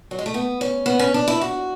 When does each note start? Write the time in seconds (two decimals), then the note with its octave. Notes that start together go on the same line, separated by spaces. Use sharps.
0.11 F#3
0.19 G#3
0.26 A3
0.34 B3
0.61 C#4
0.86 B3
0.99 C#4
1.14 D4
1.28 E4
1.41 F#4